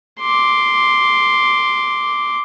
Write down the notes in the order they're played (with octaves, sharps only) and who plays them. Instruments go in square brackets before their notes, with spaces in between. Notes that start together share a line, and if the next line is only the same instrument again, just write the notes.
[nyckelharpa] C6 D6